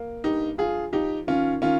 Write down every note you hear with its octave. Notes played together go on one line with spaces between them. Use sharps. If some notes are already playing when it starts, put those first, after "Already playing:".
Already playing: A#3
G2 D#4 G4
F3 F4 G#4
F3 D#4 G4
D#3 C#4 F4
D#3 C#4 F4